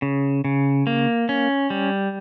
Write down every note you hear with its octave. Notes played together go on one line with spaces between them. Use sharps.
C#3
C#3
A#3
C#4
G3